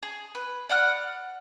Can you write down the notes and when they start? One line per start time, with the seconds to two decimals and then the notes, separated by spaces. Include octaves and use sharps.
0.03 G#4
0.35 B4
0.69 D5 F#5 F6 F#6